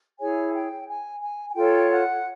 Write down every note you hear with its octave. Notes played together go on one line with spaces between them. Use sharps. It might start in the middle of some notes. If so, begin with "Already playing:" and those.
E4 G#4 C#5 G#5
G5
G#5
G#5
G#5
F4 A4 C#5 G5
F#5